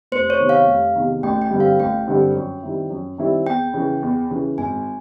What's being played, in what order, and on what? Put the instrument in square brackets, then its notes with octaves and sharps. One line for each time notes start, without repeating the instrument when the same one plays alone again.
[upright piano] F1 [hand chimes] C5
[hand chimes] C#5
[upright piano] E2 C3 D#3
[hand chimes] F5
[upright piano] F1
E2 C3 D#3
[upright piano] A1 [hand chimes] G5
[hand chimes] G5
[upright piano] G2 D3 G3 C4
[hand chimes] F5
[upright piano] A1 [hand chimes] G5
[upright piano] G2 D3 G3 C4
F#2
D#3 G3 C4 E4
F#2
D#3 G3 C4 E4
[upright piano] E2 [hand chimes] G5
[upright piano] C#3 E3
E2
C#3 E3
[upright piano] G#1 [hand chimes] G#5